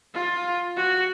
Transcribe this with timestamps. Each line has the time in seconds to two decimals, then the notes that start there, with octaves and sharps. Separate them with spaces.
0.14 F4
0.77 F#4